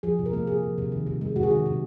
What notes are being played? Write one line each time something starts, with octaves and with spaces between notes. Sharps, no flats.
F3 G#4
C3
A#4
A#3
C3 G#4
F3
C3
D#3
C3
G#3
C3 F#4
G#4
D#3 F#4
C3